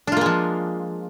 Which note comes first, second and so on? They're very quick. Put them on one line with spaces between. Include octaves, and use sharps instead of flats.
D4 F4 A#3 G#3 F3